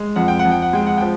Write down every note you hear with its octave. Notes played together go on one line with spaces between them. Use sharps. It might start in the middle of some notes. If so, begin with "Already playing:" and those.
Already playing: G#3
F2 F#5
G5
F#5
F2
G5
F#5
G#3 G5
F#5
F3 G5